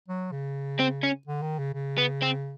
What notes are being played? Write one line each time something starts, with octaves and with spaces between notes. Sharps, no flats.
F#3
C#3
C4
C#4
D3
D#3
C#3
C#3
B3
C4